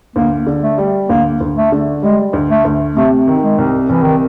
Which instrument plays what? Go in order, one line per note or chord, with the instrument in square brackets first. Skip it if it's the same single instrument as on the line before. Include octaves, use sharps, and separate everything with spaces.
[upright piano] D2 [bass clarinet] A#3
[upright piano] D3
[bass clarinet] A3
[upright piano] G3
[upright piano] D2 [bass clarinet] A#3
[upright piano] D2
[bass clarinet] A3
[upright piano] D3
[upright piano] G3 [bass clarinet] G#3
[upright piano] D2
[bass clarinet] A3
[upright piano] D2
[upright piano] C3 [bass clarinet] A3
[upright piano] D#3
[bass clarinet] G#3
[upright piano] C2
[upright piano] C2 [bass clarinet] E3
[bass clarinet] D#3